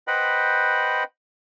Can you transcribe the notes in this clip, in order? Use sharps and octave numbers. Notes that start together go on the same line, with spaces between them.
B4 C5 D#5 F#5 G5 B5